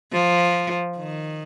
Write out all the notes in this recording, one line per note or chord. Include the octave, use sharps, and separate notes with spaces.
F3
D#3